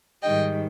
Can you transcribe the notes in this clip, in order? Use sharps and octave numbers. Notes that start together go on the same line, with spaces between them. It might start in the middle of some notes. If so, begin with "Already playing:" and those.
G#2 D#3 G3 D#5 G5